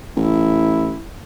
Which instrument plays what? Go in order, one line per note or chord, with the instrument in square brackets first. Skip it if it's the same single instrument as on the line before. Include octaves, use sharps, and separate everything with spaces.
[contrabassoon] A1 [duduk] E4